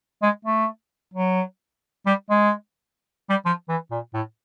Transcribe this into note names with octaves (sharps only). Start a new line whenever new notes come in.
G#3
A3
F#3
G3
G#3
G3
F3
E3
A#2
A2